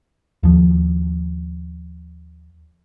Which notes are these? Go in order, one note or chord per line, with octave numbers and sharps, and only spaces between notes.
D#2 F3